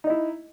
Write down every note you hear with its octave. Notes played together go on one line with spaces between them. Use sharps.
D#4 E4 D#5